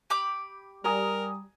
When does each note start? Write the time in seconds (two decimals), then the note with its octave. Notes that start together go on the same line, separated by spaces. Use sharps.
0.10 G4 B5 D6
0.84 G3 A#4 G#5 A#5 D#6